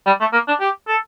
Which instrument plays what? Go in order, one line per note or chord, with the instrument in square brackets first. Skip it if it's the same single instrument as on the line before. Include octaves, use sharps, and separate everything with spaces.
[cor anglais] G3
A3
A#3
D4
G4
A4